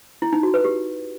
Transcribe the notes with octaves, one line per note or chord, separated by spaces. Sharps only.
E4
D#4
F#4
B4
G4